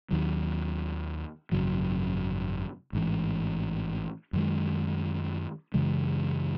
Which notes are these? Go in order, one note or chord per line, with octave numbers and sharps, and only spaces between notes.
D#2 D#3 F#3
G#1 F#2 C#3 F#3
A1 G#2 E3
F#2 D#3 G#3
F#2 C#3 E3 G#3